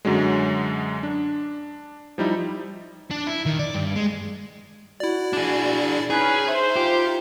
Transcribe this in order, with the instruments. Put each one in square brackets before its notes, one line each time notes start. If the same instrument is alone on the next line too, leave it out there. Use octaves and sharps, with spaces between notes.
[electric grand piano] F#2 D3 F#3 G#3
D4
F3 G3 D#4 E4
[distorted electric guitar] D4
E4
D#3
D5
G2
G#3
[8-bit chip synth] E4 D5 [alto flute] F#4
[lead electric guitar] D4 G#4
[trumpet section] C#4 B4 [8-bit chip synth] D#4 [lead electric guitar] G#4 [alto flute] G#5
[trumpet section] C5 [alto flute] E5
[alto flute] F4 [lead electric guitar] G4